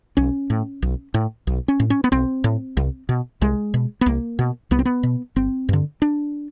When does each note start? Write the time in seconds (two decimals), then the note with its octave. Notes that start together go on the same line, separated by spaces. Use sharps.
0.17 B1 C#4
0.50 A2
0.82 B1
1.14 A2
1.47 B1
1.68 C#4
1.80 A2
1.90 C#4
2.04 B3
2.12 B1 C4
2.44 A2
2.77 C2
3.09 B2
3.42 C2 G#3
3.74 B2
4.01 B3
4.06 C2 A#3
4.39 B2
4.71 C2 B3
4.79 C4
4.85 B3
5.03 B2
5.36 G1 C4
5.69 G2 D3
6.02 D4